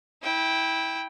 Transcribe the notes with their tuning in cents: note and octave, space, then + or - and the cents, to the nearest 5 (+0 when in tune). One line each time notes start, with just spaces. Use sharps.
E4 -20 G5 +0